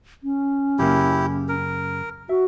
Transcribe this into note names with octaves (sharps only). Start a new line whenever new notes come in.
C#4
F#2 C#3 A#3 E4 G4
A#4
F#4 E5